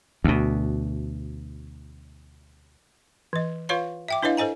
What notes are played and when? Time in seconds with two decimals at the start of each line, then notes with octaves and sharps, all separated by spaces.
0.24 D2 B2
3.33 E3 D#5
3.69 F4 B4 C#5 F5 C6
4.08 E5 G5 D6
4.23 D4 E4 B4 C#5 D#5 F5
4.37 A4 C5 D#5 G#5 A#5